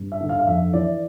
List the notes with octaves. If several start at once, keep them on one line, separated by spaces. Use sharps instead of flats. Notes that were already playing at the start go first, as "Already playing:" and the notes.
Already playing: G2
E5
D3
F5
F5
F2 E5
E3 D5